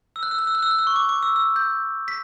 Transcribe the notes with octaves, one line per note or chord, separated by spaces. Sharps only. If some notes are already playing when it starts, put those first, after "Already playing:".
E6
F#6
E6
F#6
E6
F#6
E6
F#6
E6
C#6
D6
D6
E6
E6
G6
B6